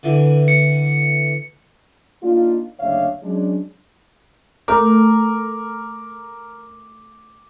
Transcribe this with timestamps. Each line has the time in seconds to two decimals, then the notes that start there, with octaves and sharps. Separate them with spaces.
0.03 D3 E3
0.48 C#7
2.23 A#3 D4 D#4 F4
2.80 F#1 D2 D4 C#5 E5 F5
3.23 F#3 G#3 C#4 D4
4.68 A3 A#4 D6